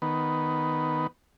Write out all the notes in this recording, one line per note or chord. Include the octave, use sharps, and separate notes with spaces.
D#3 B3